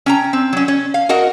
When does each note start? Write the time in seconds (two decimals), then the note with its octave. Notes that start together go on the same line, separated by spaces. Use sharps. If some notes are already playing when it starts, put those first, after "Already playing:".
0.06 C#4 G5 A#5
0.33 C4
0.53 F#3 C#4
0.68 C#4
0.94 F5
1.09 F#4 A#4 D#5 F#5